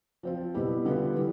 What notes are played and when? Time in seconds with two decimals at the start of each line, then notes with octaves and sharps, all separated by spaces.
0.23 F3 C4 F4
0.54 B2 G3 B3 E4 G4
0.85 D3 G3 B3 F4
1.16 E3 G3 B3